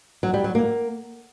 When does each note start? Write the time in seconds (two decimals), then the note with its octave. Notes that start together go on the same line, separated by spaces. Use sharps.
0.23 F#3
0.34 G3
0.44 F#3
0.55 A#3